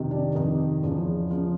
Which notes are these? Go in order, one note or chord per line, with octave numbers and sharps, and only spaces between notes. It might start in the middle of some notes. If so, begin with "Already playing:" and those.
Already playing: F2 C3 D#3
D4
F2 C3 D#3 D#4
E2 C#3 F3
C#3 F3